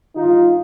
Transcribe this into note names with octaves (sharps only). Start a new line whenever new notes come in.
G2 D#3 D#4 F4